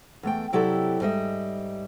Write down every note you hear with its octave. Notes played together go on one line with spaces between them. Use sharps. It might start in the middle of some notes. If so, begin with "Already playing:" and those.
E2 A3 G5
C3 F#3 E4 G4 A4 D5
G#2 G3 D#5 E5